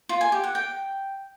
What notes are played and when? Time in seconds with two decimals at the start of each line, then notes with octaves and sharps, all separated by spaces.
0.09 F4
0.21 G#5
0.32 G4
0.44 F#5
0.55 G5